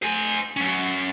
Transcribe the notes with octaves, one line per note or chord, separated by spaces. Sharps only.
C5 G#5
F#3 C#4